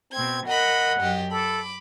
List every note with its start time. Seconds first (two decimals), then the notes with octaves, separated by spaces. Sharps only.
0.12 B2 C4 G#6
0.46 A#4 D#5 F#5 B5
1.00 F#2 G4 D#5
1.31 A4 B5 D6